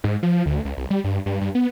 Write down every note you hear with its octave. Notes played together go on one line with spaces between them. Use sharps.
G#2
F3
D2
C#2
C2
G3
G2
G2
G2
B3